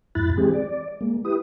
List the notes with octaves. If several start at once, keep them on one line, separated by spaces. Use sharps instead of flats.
F2 G#2 E4 B5 F#6 A6
E3 G#3 C4 G4 G#4
D5
G#3 A#3
E4 G4 B4 D#6